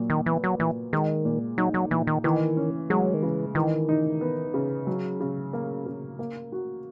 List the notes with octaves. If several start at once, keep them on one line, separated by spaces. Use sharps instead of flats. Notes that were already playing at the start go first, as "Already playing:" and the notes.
Already playing: A#2 F#3
D#3
E3 B3
F#3
A#2 E3
D#3 G#3
A#2
F#3 D#4
F#3
A#2 E3
D#3
D#3 E3
C#4
F#3 G#3
D#3
C#3 E3
D#3 E3
D#4
B3
C#3
F#3
C#3
A#3
C#3
A#3
F#4